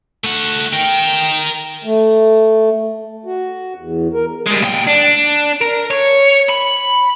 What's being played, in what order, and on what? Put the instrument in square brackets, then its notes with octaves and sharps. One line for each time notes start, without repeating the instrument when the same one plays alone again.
[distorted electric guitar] A3 F#5
[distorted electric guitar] A#4 D#5 [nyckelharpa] G5
[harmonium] A3
F#4
E2
A#4
[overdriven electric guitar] G3 G#3
A#2 G5
D4
A#4
C#5
B5